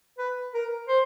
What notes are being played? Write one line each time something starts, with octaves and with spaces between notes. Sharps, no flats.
B4
A#4
C5